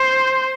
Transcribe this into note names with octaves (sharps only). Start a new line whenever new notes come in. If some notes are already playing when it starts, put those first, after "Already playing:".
Already playing: C5